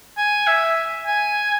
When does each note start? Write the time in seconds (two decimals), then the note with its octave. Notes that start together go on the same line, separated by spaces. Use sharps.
0.17 G#5
0.47 E5
1.06 G#5